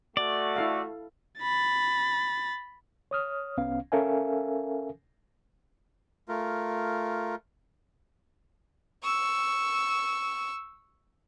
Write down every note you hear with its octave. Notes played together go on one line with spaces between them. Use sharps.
A3 F#4 D5
E4 A4 F5
B5 A6
C#5 D#6 F6
C2 B3 C#4 F5
C#4 A4 A#4 E5 F5 G#5
A3 F4 A#4
C#6 E6